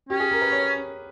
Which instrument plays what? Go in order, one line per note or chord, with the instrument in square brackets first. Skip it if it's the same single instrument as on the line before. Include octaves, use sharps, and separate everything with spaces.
[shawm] C#4 [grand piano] G4
[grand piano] G#4
A#4
B4
C#5